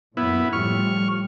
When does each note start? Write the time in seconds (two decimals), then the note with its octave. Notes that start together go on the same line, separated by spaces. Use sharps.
0.17 F#2 A#2 B3 E4
0.53 A2 F3 G3 C#6 F6